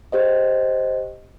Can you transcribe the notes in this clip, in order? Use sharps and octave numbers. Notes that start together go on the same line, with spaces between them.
G4 C5 D#5